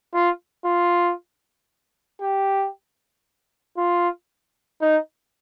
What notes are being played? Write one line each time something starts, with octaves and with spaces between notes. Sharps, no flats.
F4
F4
G4
F4
D#4